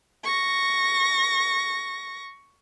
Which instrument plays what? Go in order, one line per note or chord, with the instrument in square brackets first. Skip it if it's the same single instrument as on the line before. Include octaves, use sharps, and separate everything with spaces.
[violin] C#6 A#6